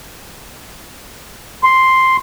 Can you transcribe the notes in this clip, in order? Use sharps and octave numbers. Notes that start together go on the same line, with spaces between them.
C6